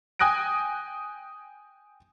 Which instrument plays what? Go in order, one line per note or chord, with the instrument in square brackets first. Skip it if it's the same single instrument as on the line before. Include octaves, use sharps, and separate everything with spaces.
[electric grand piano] G5 G#5 D#6 F#6 A#6 D7